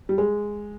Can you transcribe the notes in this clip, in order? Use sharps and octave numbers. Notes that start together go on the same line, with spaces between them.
G3
G#3